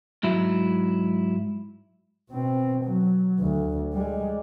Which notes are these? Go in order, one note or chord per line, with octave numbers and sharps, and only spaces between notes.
G#2 F#3 E4
B2 C4
F#3
D2
G3 G#3